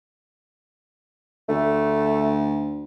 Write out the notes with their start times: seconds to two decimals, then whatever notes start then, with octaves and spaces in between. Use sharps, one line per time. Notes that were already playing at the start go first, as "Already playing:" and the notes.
1.49 D2 A3